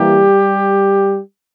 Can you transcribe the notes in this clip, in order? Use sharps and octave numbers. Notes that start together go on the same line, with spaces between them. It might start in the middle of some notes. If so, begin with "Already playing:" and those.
Already playing: E3 G3 A#3 G4